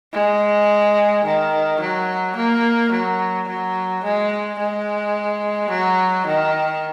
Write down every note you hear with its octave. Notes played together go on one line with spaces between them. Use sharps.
G#3
D#3
F#3
A#3
F#3
F#3
G#3
G#3
F#3
D#3